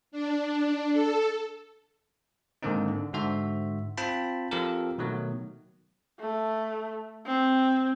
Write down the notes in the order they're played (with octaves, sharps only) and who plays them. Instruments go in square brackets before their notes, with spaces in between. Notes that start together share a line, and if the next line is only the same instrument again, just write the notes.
[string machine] D4
A4
[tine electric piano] G#2 D3 D#3 A#3 C4 D#4
D3
G#2 D3 F#4 C5 E5
C4 F4 G5 A5 B5
F3 C4 F4 G4 A4 A#4
B2 D#3 F#3 A3
[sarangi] A3
C4